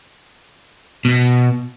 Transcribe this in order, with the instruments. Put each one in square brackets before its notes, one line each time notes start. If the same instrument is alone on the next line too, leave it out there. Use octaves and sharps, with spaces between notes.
[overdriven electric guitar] B2